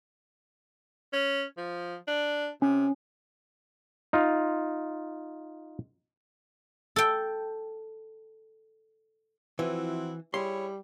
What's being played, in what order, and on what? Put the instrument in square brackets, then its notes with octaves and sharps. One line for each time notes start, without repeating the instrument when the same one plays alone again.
[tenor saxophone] C#4
F3
D4
[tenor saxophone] C3 [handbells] C#4
[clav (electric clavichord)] D#4 F4
[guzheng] A4 G5
[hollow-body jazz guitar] E3 [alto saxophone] F3 [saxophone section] C4 E4 F#4
[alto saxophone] G3 [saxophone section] E4 G#4 C#5 [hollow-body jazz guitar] C6